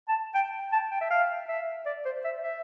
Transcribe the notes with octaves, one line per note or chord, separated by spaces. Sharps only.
A5
G5
A5
G5
E5
F5
E5
D5
C5
E5
E5